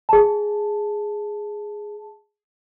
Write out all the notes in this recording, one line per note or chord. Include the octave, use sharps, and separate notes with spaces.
G#4 A5